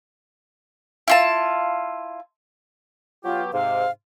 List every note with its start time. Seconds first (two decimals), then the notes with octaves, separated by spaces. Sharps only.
1.08 E4 F4 A5
3.24 F#3 B3 F4 G4
3.53 G#2 C3 F5